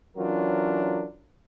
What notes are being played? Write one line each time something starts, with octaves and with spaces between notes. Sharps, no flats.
E3 F#3 C#4 D4 F4 A#4